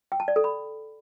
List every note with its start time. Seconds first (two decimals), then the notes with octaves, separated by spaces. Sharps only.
0.12 G5
0.20 A5
0.28 D5
0.36 A4
0.44 B5